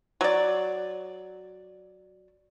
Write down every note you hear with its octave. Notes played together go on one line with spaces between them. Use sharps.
F#3 D5